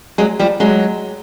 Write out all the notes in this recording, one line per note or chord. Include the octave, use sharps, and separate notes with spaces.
F#3 G#3
F3 G3
F#3 G#3